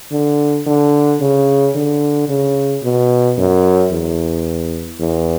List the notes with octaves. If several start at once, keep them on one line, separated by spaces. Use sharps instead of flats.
D3
D3
C#3
D3
C#3
B2
F#2
E2
E2